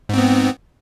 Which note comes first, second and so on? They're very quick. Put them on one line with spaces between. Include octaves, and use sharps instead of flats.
G#2 C4 B3